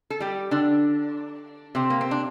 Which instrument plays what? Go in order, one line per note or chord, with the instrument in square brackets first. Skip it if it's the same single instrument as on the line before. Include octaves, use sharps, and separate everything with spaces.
[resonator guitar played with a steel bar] A4
G3 G4
D3 D4
C3 C4
A#3
C4
D4